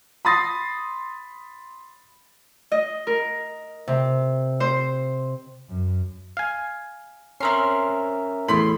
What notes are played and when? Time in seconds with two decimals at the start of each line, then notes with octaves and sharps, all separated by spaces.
0.25 B5 C6 D#6 A6 A#6 C7
2.72 D#5
3.07 A#4
3.88 C3
4.60 C5
5.69 F#2
6.37 F5 G#5
7.40 C4 C#4 D#4 A#4 E5 C6
8.48 E2 A2 B5 C6